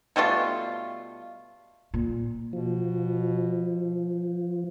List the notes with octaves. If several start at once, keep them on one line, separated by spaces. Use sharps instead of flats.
B2 G3 A3 F4
A#2
B2 F3